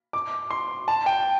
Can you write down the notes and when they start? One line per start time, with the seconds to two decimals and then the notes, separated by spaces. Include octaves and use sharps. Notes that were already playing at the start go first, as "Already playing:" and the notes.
0.13 D6
0.51 C6
0.88 A5
1.06 G5